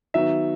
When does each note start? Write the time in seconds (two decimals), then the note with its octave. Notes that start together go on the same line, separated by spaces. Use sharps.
0.14 D#3 F#3 B3 D#4 E5